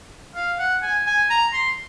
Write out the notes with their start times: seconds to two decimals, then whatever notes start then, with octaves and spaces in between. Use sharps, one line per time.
0.35 F5
0.59 F#5
0.82 G#5
1.07 G#5
1.30 A#5
1.53 C6